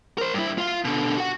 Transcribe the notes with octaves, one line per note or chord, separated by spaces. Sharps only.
A#4 C5
G2 E4
F4 F5
B2 D3
F#4 F#5